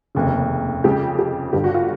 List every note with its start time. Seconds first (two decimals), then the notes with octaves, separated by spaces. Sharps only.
0.15 F1 D#2 C#3
0.84 F2 C#3 F3 G#3 G4
1.19 G4
1.53 G1 G2 D3 G4
1.64 F#4
1.74 F4